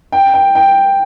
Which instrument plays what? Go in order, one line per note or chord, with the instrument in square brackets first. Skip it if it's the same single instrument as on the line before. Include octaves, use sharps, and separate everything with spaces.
[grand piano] G5
G5
G5